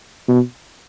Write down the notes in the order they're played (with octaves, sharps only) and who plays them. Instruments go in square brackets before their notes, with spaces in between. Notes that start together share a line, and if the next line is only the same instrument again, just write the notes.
[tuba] B2